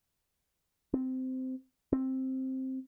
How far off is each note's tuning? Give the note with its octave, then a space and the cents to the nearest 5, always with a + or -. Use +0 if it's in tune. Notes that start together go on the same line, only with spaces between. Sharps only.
C4 -15
C4 +5